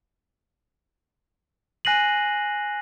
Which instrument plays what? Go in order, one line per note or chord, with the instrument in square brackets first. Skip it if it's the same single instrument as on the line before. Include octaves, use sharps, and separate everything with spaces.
[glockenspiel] G#5 F#6 A#6 C7 D#7 F#7